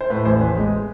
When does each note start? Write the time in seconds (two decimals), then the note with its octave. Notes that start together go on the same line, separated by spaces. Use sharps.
0.01 C5
0.10 A2 B4
0.25 A1 C5
0.41 A1 B4
0.57 G#3